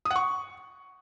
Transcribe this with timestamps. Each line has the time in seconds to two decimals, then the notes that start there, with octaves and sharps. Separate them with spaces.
0.05 D#6
0.11 F#5
0.16 C#6